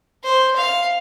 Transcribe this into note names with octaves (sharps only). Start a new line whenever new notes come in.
C5
F5